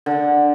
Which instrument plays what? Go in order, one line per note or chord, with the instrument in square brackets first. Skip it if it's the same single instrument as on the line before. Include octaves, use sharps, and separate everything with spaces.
[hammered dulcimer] D3